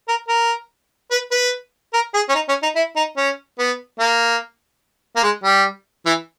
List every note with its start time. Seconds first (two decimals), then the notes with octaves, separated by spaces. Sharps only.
0.08 A#4
0.29 A#4
1.11 B4
1.31 B4
1.94 A#4
2.14 G#4
2.29 C#4
2.35 D#4
2.49 C#4
2.63 D#4
2.76 E4
2.96 D#4
3.17 C#4
3.59 B3
3.99 A#3
5.16 A#3
5.23 G#3
5.44 G3
6.06 E3